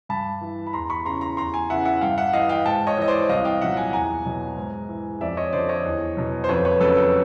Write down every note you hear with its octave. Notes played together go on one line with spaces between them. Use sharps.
G2 A5 B5
E3
B5
E2 A#5 C6
B5 C#6
C#3 E3 A#5 C6
A#5 C6
E2 A#5 C6
G#5 A#5
C#3 E3 E5 F#5
E5 F#5
G2 F5 G5
E5 F#5
E3 D#5 F5
F5 G5
G#2 G5 A5
C#5 D#5
E3 D#5
C5 D5
C2 D#5 F5
F5 G5
A#2 F#3 E5 F#5
F#5 G#5
E2 G#5 A#5
B2 F#3
G#2
E3
F2 D5 E5
C#5 D#5
D3 F3 C5 D5
C#5 D#5
E2
B2 F#3
C5
F2 B4 C#5
B4 C#5
C#3 F#3 A4 B4
A4